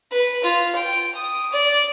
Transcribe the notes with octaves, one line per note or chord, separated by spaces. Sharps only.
B4
F4
G5
D#6
D5